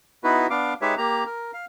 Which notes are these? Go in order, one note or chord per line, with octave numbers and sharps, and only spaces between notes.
B3 D#4 E4 F#4 B4
B3 D4 F5 D6
G#3 D#4 G4 B4 C#5 E5
A#3 G4 A#5
A#4
F5